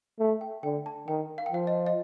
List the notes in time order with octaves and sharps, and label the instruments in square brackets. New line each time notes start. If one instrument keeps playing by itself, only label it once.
[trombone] A3
[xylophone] G5
[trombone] D3 [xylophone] G5
[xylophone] A5
[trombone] D#3 [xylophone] G5
[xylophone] F5
G5
[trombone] F3 [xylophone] F5
[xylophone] D#5
D#5